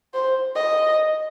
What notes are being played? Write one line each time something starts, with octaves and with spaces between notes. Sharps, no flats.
C5
D#5